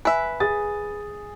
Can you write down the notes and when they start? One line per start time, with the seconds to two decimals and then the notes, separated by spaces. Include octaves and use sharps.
0.05 B4 E5 G#5
0.40 G#4 D#6 A6